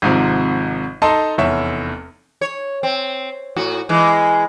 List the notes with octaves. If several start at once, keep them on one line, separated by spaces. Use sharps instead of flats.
G#1 G#2 C3 F3
D#4 A4 D#5 A5 A#5 C6
F1 E2 C#5 E5
C#5
C4
A2 F#4
E3 G#3